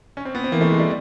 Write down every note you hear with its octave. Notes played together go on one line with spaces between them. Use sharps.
C#4
C4
B3
C4
E3 A#3
A3
G#3
G3